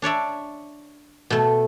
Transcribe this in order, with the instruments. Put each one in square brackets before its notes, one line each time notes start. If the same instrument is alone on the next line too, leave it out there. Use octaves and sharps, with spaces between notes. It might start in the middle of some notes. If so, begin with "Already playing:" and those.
[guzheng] D4 C#5 D5 E5
B2 A3